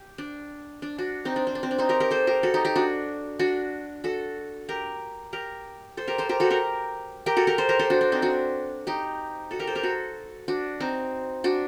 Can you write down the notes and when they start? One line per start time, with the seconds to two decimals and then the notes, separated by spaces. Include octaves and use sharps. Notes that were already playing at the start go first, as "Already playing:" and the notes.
Already playing: G4
0.18 D4
0.82 D4
0.98 D4 F#4
1.25 C4 D#4
1.36 D4
1.47 C4
1.55 D4
1.63 C4
1.71 D4
1.78 C4 D#4
1.89 G4 A#4
2.00 G4 A#4
2.11 A4 C5
2.27 G4 A#4
2.43 F#4 A4
2.54 D#4 G4
2.65 D#4 G4
2.76 D4 F#4
3.39 D4 F#4
4.04 F#4 A4
4.69 G4 A#4
5.33 G4 A#4
5.97 A4 C5
6.08 G4 A#4
6.18 A4 C5
6.29 G4 A#4
6.40 F#4 A4
6.50 G4 A#4
7.26 G4 A#4
7.37 F#4 A4
7.47 G4 A#4
7.58 A4 C5
7.69 G4 A#4
7.79 A4 C5
7.90 D4 F#4
8.01 D4
8.12 C4 D#4
8.22 D4 F#4
8.87 D#4 G4
9.51 F#4 A4
9.59 G4 A#4
9.67 A4 C5
9.75 G4 A#4
9.83 F#4 A4
10.48 D4 F#4
10.80 C4 D#4
11.44 D4 F#4